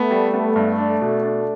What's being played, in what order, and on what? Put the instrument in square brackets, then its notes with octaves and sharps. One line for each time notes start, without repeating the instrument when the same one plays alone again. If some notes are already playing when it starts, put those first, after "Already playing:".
Already playing: [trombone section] A3 [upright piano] B3
[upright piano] G3
B3
G2
D4
B2
D4